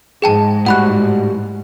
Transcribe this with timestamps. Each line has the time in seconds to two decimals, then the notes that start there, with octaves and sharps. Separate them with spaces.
0.22 G#2 G#4 G5 A5
0.66 A2 G3 F#4 F#5 B5 F#6